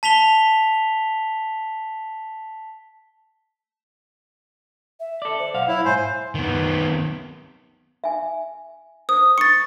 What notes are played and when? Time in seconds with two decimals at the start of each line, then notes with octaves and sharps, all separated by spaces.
0.03 A5 B6 F7 G7
5.00 E5
5.22 A4 D5
5.39 C5
5.54 B1 C5 F5 F#5
5.68 E4 C#5
5.85 G#2 C5 G#5
6.35 D#3 B3
8.04 E5 G#5
9.09 C5 D#6
9.38 C#6 D#6 A6 C#7